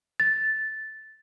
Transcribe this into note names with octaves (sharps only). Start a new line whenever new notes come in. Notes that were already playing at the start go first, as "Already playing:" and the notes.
A6